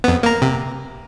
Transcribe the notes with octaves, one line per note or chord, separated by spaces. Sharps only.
F2 B3
A#3 A#5
C3